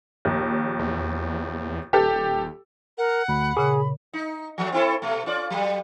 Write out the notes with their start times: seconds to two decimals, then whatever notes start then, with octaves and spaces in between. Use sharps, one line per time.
0.25 A#1 D#2
0.79 E2
1.93 D#1 G4 A4
2.98 A#4 F#5
3.28 D2 B5
3.57 A#2 C#3 G#4
4.13 D#4
4.58 F3 F#3 A3
4.72 C4 E4 A4
5.02 B2 A3
5.26 C#4 F4 D5
5.50 F#3 G3